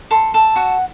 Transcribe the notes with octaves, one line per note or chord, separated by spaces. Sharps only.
A4 C6
A4
F#4 F#5